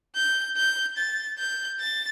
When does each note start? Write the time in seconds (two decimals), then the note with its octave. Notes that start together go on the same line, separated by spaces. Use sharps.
0.15 G6
0.57 G6
0.97 A6
1.39 G6
1.80 A6